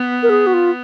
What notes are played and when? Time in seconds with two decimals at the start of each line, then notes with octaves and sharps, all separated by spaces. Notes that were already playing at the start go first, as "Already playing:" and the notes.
Already playing: B3
0.23 A#4
0.30 G#4
0.47 F#4
0.54 F4